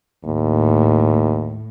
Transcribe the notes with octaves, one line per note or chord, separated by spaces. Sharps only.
D#2 A2